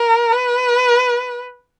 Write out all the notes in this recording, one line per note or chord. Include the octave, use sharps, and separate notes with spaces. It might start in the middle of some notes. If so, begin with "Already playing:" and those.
Already playing: A#4
B4